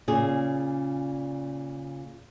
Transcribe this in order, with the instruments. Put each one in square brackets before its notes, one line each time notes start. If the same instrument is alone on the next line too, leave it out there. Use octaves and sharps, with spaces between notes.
[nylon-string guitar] A#2 C#3 G#4